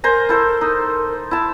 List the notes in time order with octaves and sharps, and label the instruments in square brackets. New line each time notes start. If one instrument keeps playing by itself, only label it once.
[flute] A#4 [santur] C5 G#5 A#5
[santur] E4 A4 C5
D#4
E4 A5